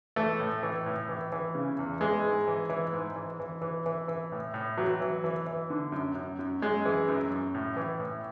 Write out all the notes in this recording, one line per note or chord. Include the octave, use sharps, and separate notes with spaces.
E3 A3
A2
E3
A2
E3
E3
C#3
E2
E3 G#3
G#2
E3
E3
G#2
E3
E3
E3
E3
E3
A2
A2
E3 F#3
E3
E3
E3
D3
F#2
F#2
F#2
F#2 G#3
E3
F#2
F#2
A2
E3
A2